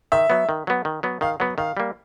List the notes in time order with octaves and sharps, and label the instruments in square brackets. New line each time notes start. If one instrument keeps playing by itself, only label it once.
[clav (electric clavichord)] D#3 [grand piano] E5
[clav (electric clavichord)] F#3 B3
D#3
F#3 B3
D#3
F#3 B3
[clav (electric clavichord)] D#3 [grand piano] F5
[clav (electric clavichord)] F#3 B3 [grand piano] F#5
[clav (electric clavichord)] D#3 [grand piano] F5
[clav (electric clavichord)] G3 A#3